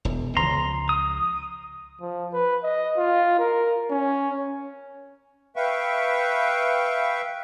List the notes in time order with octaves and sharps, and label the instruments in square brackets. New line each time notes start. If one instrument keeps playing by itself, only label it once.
[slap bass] E1 E2
[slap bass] C#2 F3 [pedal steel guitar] A#5 C6
[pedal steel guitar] D#6
[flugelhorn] F3
B4
D#5
F4
A#4
C#4
[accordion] B4 E5 F5 G5 C#6